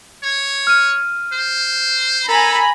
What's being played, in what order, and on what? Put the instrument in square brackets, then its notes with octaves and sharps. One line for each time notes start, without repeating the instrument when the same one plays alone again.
[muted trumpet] C#5
[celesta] F6 D#7
[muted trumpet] C5
[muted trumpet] A4 [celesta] A#4 [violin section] G#5 A#5 B5